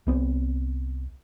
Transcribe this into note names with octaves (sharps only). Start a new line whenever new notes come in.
C2 B3 C4